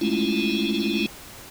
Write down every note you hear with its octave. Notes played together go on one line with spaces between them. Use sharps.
G#3 A3 C#4 E4 F4